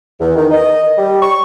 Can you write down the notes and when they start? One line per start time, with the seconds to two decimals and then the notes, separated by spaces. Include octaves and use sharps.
0.19 E2
0.36 D#3
0.51 D#5
0.98 G3
1.22 C#6